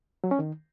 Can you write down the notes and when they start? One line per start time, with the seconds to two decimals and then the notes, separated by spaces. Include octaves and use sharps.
0.24 F#3
0.31 C#4
0.39 D#3